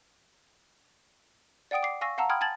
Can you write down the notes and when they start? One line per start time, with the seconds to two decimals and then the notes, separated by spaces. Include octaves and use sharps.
1.71 D5 F#5 G5 D#6 D7
1.83 D6 C7
2.01 F5 G#5 C#6 E6 A#6 C7
2.18 F5 F#5 A5 A#5 E6
2.30 G5 B5 C6 D#6 F6 G#6
2.41 G#5 A5 G#6 A6 F#7